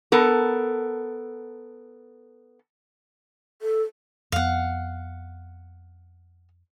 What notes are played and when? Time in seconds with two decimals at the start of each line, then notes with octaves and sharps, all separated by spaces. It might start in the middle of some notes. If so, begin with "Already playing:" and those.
0.12 B3 A4 A#4
3.62 A4
4.32 F2 B3 F5 F#5